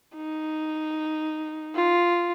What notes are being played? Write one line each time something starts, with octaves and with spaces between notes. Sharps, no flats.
D#4
F4